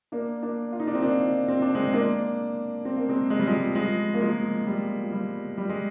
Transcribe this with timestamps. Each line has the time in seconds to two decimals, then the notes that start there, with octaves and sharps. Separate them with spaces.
0.12 A#3 D4
0.43 A#3 D4
0.72 F4
0.80 D#4
0.87 D4
0.95 C4 D#4
1.02 A#3 D4
1.48 C4
1.62 D4
1.75 G#3 C4
1.93 A#3 D4
2.85 C4
2.98 A#3
3.09 G#3 C4
3.30 G#3
3.39 G3
3.47 F3 G#3
3.75 F3 G#3
4.14 A#3
4.21 F3 G#3
4.66 G3
5.03 F3
5.12 G3
5.58 G3
5.69 G#3